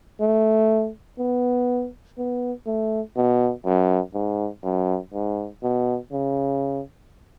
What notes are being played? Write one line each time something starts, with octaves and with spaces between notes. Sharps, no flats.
A3
B3
B3
A3
B2
F#2
G#2
F#2
G#2
B2
C#3